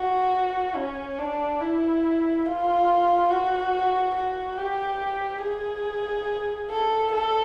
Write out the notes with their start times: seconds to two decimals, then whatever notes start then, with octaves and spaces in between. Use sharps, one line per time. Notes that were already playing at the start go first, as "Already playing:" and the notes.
Already playing: F#4
0.76 C#4
1.18 D4
1.60 E4
2.46 F4
3.30 F#4
4.15 F#4
4.58 G4
5.42 G#4
6.70 A4
7.12 A4